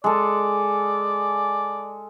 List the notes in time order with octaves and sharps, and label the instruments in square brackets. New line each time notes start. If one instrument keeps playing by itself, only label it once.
[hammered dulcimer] G#3 A4 [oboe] D5